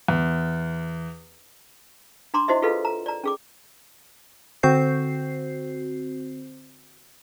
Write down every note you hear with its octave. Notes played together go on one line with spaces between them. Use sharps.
E2
D4 A#5 C6 D6
E4 F#4 C5 D#5 E5
F4 G#4 A4 B4 D#5 F5
A#5
D5 A#5
C#4 G#4 D6
D3 C4 F#4 C5 G6 C7